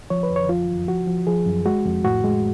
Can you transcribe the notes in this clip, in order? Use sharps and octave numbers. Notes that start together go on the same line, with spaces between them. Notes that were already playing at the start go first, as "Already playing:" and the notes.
F3 C#5
B4
F2
C#5
F3 F4
F#2
F3 F#4
F3
F3 G#4
F#2
G#3 F#4
F2
A2 F#4
G#3